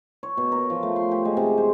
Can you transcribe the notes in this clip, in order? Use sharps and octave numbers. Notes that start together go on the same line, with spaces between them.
C#5
B2
A#4
F3
A3
C6
G4
G#3
C3
C5